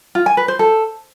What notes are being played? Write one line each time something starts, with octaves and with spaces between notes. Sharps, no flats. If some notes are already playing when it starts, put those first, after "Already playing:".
F4
G#5
B4
C5
A4